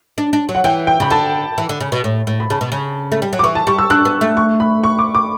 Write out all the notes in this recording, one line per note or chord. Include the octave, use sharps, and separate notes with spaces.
D4
D4
F#3
F#5
E3 G5
G5
C#3 B5
D3 A5
E3
D3
C#3
B2
A2
A2
B5
C#3 A5
B2
C#3
A3
G3
F#3
D6
E3 C#6
A5
G3 C#6
E6
D4 F#6
B3
A3
C#6
B5
C#6
D6
D6